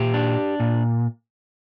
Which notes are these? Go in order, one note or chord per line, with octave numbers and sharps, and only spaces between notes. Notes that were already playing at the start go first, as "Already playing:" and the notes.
Already playing: A#2 G4
D4
A#2